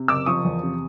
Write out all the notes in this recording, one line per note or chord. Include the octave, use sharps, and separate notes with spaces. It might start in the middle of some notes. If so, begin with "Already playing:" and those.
Already playing: C3
F#1 D6 E6
F3 C#6 D#6
E2
C3